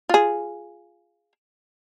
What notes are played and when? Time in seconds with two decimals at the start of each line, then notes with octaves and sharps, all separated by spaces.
0.09 F4 G#4